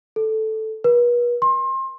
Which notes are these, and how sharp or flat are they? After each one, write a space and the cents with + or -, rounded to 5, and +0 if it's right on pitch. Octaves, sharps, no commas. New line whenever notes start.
A4 -5
B4 -40
C6 +30